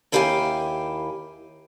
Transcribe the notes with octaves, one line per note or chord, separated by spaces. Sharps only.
D#2 E4 G4 F5 F#5 G#5